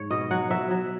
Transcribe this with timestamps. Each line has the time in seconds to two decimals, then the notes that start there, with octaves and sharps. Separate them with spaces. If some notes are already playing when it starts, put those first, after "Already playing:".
Already playing: G#2 C#5
0.11 B2 D#5
0.31 F#3 F#5
0.51 F#3 E5
0.71 F#3